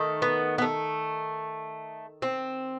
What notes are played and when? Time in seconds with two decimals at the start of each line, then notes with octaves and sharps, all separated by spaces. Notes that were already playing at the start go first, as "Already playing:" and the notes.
Already playing: D#3 A3
0.22 B3
0.58 B3
0.62 A3
2.22 C4